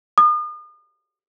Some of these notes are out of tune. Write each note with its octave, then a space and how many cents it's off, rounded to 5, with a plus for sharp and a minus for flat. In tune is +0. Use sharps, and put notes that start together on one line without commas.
D#6 -40